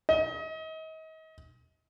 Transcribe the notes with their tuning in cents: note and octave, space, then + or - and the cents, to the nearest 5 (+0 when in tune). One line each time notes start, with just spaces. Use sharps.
D#5 +35